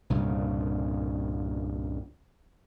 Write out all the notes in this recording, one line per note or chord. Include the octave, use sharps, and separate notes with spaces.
C2 G2 A#2 C#3